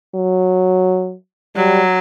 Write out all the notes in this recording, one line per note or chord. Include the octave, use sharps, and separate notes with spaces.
F#3
F#3 G3